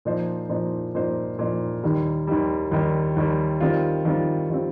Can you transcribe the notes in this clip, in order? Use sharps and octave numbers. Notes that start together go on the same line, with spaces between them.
A#2 F3 D#4 C5
A#2 F3 D#4 C5
A#2 F3 D#4 C5
A#2 F3 D#4 C5
D#2 D#3 G3
D#2 D#3 G3
D#2 D#3 G3
D#2 D#3 G3
D#3 G3 C4 F4
D#3 G3 C4 F4
D#3 G3 C4 F4